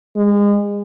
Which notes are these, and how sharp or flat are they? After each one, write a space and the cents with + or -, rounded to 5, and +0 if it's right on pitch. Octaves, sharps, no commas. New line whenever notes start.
G#3 -30